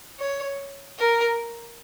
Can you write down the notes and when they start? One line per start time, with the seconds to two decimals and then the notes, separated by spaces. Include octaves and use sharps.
0.19 C#5
0.99 A#4